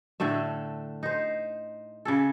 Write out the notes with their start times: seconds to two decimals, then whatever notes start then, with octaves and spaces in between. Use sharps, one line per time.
0.20 A2 D3 A3 E5
1.03 D#4 C5
2.05 C#3 G#4 A4